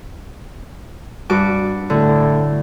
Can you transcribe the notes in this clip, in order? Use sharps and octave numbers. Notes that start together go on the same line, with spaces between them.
G2 F#4 D6
A2 D3